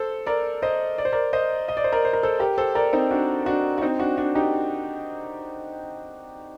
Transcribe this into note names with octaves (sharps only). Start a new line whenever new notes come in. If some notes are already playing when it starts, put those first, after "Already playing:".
Already playing: A4 C5
A#4 D5
C5 D#5
D5
C5
A#4 D5
C5 D#5
D#5
D5
C5
A#4 D5
C5
A#4
A4 C5
G4 A#4
A4 C5
A#4 D5
C4 D#4
D4 F#4
D4 F#4
F#4
C4 D#4
D4 F#4
D4 F#4
D#4 G4